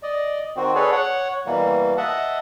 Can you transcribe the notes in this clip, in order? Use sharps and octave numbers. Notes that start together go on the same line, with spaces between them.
D5 D#5
D#3 C4 F#4
G#4 A4 B4 C#5 D5
C#5 F#5
B2 E3 G3 A#3
D#5 E5 F#5 A5